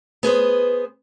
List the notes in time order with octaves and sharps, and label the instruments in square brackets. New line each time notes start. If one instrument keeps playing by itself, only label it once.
[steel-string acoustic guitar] B3 G#4 B4 C5